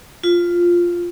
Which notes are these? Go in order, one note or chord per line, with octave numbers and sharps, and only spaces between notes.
F4